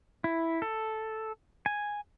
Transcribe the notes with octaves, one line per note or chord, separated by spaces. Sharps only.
E4
A4
G#5